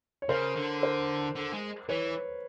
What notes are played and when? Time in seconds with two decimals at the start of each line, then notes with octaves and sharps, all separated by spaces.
0.22 C#5
0.29 C#3 A#4 C5
0.56 D3
0.82 A#4 C5
1.35 D3
1.53 G#3
1.89 E3 B4 C#5